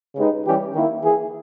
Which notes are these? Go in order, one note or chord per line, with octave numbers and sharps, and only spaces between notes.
C#3 G#3 D#4 G4 B4
E3 G3 C#4 G4
D#3 A#3 E4
E3 A#3 E4 G#4